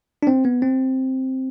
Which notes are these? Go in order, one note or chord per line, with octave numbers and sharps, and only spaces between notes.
D4
C4
B3
C4